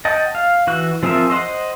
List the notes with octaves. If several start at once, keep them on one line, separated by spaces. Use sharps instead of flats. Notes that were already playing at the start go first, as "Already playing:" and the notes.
D#5 F#5 G5 A5
F5
E3 F#4 F#6
F3 C4 G#4 A#4 E5
C5 D#5 F#5 C6